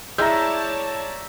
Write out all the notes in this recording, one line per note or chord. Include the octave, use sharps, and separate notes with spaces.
G#3 E4 C#5 D5 E5 A5 A#5 G6